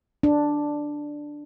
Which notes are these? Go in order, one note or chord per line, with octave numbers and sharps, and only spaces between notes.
D4